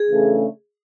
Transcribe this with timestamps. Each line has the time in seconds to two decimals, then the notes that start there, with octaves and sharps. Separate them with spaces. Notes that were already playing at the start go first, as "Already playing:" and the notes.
Already playing: G#4
0.09 C#3 E3 A3 D4